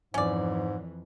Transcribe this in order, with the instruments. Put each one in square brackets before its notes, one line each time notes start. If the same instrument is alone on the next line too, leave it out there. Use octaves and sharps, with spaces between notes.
[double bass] F2 E3 [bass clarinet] G#2 [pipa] C#4 D5